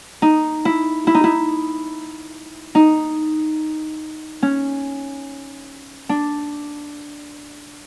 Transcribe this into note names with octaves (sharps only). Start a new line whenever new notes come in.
D#4
E4
E4
D#4
E4
D#4
C#4
D4